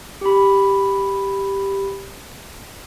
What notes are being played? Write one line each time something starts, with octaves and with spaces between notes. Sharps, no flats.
G4 B5